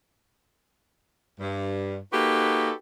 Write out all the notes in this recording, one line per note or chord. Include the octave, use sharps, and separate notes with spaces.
G2
A#3 D#4 F#4 G4 A4 B4